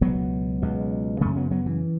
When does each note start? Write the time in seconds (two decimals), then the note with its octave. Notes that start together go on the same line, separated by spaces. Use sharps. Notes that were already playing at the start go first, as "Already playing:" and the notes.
0.01 C#2 B2 F#3 B3
0.62 C#2 B2
1.21 F#2 C#3 A3 C#4
1.36 F#3 B3
1.51 F#3 B3
1.66 E3